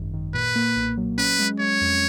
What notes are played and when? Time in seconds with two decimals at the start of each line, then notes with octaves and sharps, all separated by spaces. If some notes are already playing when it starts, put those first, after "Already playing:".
Already playing: G#1 F#2 D#3
0.14 D#3
0.34 A#2 B4
0.56 A#3
0.76 B1
0.97 F#3
1.18 C#4 B4
1.39 G#3
1.60 G#3 C#5
1.81 F2